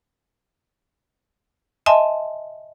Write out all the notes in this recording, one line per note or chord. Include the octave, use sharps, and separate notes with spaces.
D#5 E5 G#5 A5 C6